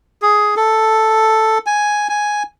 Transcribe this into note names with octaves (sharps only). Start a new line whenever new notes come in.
G#4
A4
G#5
G#5